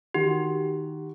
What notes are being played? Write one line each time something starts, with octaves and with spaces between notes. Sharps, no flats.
D#3 F#4 G4